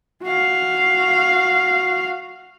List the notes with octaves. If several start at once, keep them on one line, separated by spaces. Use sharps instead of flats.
F#4 F5